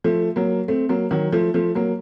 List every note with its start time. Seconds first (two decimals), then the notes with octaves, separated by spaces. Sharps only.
0.04 F3 A3
0.36 F#3 A#3
0.68 A3 C4
0.89 F#3 A#3
1.11 D#3 F#3
1.32 F3 A3
1.54 F3 A3
1.75 F#3 A#3